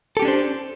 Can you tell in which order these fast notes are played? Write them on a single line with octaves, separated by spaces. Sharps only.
A4 G4 C#4 D4 C5